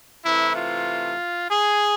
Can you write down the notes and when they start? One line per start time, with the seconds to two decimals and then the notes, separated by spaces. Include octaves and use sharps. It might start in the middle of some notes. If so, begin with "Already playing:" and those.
0.25 C3 E3 A3 E4
0.56 F4
1.51 G#4